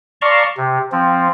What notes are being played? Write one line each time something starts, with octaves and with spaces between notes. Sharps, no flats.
D5 F5 A5 A#5 C6 C#6
C3
F3 C4